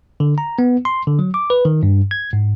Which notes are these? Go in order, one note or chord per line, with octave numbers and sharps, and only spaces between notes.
D3
A#5
B3
C6
D3
F#3
D6
B4
D#3
G2
G#6
G#2